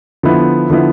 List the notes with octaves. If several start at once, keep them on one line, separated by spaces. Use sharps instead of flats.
D3 F3 B3 E4
D3 F3 B3 E4